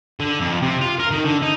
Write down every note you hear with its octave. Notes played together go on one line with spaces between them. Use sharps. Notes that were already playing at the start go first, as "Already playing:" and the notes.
D3
F2
C3
F4
A#4
D#3
D3
D#4